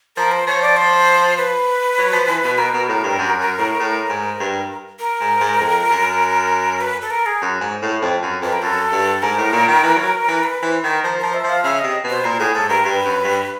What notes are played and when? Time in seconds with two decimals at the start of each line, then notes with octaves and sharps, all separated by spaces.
0.16 F3 A#4
0.32 C5
0.47 F3 C#5
0.62 D5
0.77 C5
1.37 B4
1.98 F#3
2.13 F3
2.28 E3
2.44 B2
2.58 B2 A#4
2.74 B2
2.89 A2
3.04 G2
3.19 F#2
3.39 F#2
3.58 A2
3.80 A2
4.09 G#2
4.40 G2
4.99 A#4
5.20 G#2
5.41 G#2
5.60 F2
5.91 F#2
6.81 B4
7.02 A4
7.10 A#4
7.26 G#4
7.42 F#2
7.61 G#2
7.82 A2
8.02 F2
8.22 F#2
8.42 F2 B4
8.53 A#4
8.62 F#2 A4
8.92 G2
9.22 G#2 A#4
9.38 A2
9.53 A#2
9.68 D#3
9.83 E3
9.97 F#3
10.28 E3
10.43 B4
10.63 E3 C5
10.83 D#3 A#4
11.04 F3 A#4
11.19 F3 A#4
11.34 E5
11.44 F3
11.49 F5
11.64 C#3 E5
11.79 C3 D#5
12.04 B2
12.09 C5
12.24 A#2 A#4
12.39 A2 G#4
12.55 G#2 A4
12.69 G2 A#4
12.84 G2 B4
13.04 F#2
13.24 G2